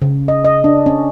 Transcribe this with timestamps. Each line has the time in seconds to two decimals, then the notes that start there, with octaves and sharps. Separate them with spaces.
0.02 C#3
0.28 D#5
0.45 D#5
0.64 D4
0.86 C#4